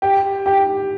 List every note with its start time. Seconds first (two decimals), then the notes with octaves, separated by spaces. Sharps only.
0.02 G4
0.46 G4